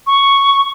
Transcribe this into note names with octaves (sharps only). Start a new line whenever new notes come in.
C#6